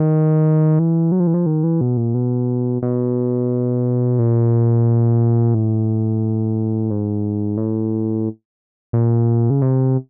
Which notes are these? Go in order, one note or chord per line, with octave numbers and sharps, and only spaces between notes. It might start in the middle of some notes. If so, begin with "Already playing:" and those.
Already playing: D#3
E3
F#3
F3
E3
F3
D#3
E3
B2
A#2
B2
B2
A#2
A2
G#2
A2
A#2
C#3
C3